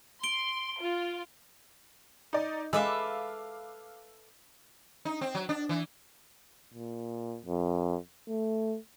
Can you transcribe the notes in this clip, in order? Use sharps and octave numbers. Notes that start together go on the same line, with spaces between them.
C6 D7 G7
F4
D#4 D5
G#3 A4 B4 E5 F5 D6 E6
D#4
C4
F#3
D4
E3
A#2
F2
A3